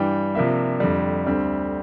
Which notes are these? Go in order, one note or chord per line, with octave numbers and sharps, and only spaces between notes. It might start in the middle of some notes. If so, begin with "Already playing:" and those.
Already playing: G2 E3 G3 G5
C3 F3 A#3 D4 E5
F2 D3 G3
D2 D3 G3 C4